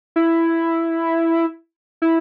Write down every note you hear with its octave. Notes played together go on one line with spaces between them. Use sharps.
E4
E4